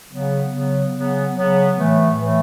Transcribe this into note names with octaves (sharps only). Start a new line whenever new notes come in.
C#3 F#3 B3
C#3 F#3 B3
C#3 F#3 B3
C#3 F#3 B3
A2 E3 A3
A2 E3 A3